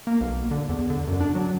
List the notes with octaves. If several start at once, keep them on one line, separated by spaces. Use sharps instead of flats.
A#3
B1
D3
E2
D3
F#2
D4
F#3